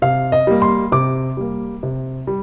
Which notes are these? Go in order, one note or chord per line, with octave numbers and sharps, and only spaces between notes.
C3 F5
D#5
G3 A#3
C6
C3 D6
G3 A#3
C3
G3